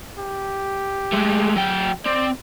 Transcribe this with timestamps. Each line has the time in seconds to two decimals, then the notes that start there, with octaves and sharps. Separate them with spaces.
0.18 G4
1.12 G#3 A3
1.56 F#3 G5
2.06 C4 D5